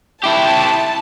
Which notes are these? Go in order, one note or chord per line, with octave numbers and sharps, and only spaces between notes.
E4 G4 A5